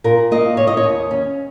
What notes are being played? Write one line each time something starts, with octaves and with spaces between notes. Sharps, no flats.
A#2 A#4
A#3 D#5
C#4 C#5
D#5
C#5
D#2
C#4